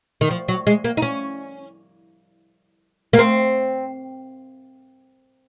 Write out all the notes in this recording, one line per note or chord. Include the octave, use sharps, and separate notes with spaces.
D#3
F3
F#3
G#3
A#3
D#4
C#4
A#3
C4